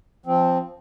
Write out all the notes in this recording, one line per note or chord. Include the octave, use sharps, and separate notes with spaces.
F3 C4